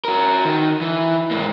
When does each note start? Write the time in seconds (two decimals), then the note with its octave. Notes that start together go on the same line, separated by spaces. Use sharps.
0.05 F#4 A#4
0.45 D#3
0.81 E3
1.31 G#2 A#3